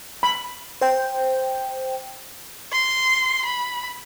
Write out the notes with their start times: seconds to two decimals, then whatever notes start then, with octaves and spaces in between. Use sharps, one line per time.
0.23 B5
0.81 C5 G5
2.72 C6
3.45 B5